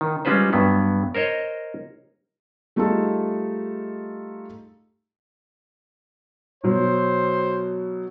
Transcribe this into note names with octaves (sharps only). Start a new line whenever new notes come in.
D#3
G3 G#3 C#4 F4 B4 C5
G2 F#3 B3
A#4 C5 C#5 D#5
G3 A3 D#4 F4 G#4 A4
B2 F#3 C5